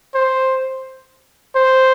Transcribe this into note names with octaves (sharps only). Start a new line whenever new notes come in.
C5
C5